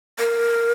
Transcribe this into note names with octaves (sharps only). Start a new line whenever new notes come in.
A#4